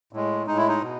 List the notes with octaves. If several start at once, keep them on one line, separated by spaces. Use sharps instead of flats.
A2 G#3
A2 G#3 D#4
E4
D#4
B2